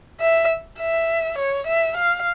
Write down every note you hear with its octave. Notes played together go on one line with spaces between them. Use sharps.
E5
E5
C#5
E5
F5